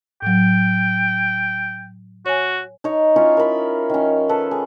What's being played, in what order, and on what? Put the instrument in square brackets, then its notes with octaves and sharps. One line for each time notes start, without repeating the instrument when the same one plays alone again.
[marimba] A2 F#3 [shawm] G5
[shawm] F#4 [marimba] C#5 G#5
[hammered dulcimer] D#4 C#5
C#4 E4 F4 C#5
A#4 B5
D#3 C#4
A4 B4
G#4